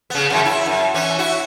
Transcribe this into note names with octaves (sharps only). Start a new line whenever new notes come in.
C#3 B3
F#2 C#3 E3
E4
F#2
E3 C#4
E4 F#4